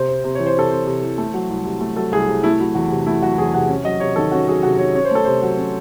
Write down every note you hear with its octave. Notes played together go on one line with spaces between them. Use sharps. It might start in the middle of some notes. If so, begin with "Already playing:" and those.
Already playing: C3 C5
C4
C3
E3 C#5
C5
C3 A4
C4 C5
C3
E3
A3
F#3
C2
C3
A3
F#3 A4
C2 G#4
C3
A3 E4
F#3 E4
E2 F#4
C3
A3 E4
F#3 F#4
E2 G#4
C3 F#5
C#4
F#3 D#5
C3 C#5
D#3 A4
C#4 F#4
F#3 G#4
C3 F#4
D#3 C#5
C#4 C#5
C5
A3 A4
C3 C5
F#3
C#4